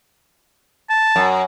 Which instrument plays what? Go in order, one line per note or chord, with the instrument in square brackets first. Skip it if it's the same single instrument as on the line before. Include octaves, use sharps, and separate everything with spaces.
[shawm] A5
[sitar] F#2